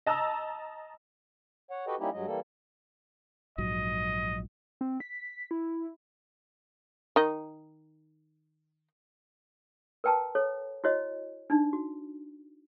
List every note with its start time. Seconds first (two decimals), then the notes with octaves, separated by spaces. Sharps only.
0.06 D#5 A5 A#5 E6
1.71 C#5 F#5
1.87 F#4 G4 A4 B4 D#5 G5
1.99 G3 A#3 C#4 D#4 E4 G4
2.13 G2 F#3 G#3 D#5
2.26 E3 G3 A#3 A4
3.58 A#1 G#2 F#3 D#5
4.81 C4
5.00 B6
5.51 E4
7.16 D#3 D#4
10.04 A#4 B4 G5 A5 A#5
10.35 A4 C#5
10.84 E4 F#4 C#5 D#5
11.50 D4 D#4
11.73 F#4